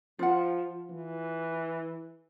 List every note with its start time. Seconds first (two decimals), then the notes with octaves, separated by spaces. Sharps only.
0.19 F3 F4 F#5
0.90 E3